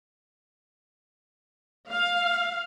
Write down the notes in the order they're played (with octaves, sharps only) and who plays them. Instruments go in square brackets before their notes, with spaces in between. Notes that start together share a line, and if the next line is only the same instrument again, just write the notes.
[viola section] F5